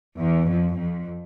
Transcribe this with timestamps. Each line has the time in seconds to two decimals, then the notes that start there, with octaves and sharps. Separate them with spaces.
0.20 E2
0.49 F2
0.77 F2